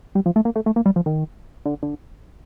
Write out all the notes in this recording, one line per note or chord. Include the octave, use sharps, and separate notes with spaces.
G3
F3
A3
A#3
A3
A3
A#3
G3
F3
D#3
D3
D3